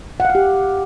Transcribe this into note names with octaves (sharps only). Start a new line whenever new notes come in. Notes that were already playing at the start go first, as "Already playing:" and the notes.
F#5
F5
F#5
G4